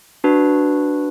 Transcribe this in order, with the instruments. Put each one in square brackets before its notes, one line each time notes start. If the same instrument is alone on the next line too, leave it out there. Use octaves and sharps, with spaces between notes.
[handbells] D4 F#4 B4